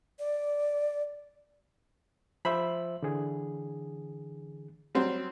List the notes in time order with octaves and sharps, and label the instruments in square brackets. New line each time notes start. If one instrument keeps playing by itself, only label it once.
[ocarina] D5
[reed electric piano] F3 C5 E5 [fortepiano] B5
[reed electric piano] D3 E3 G#4
[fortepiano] F#3 G3 C4